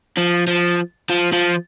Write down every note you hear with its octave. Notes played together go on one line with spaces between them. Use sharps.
F3
F3
F3
F3